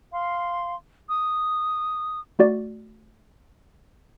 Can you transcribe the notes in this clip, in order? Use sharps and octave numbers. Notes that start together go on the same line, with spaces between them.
F5 C6
D#6
A3 F#4 D5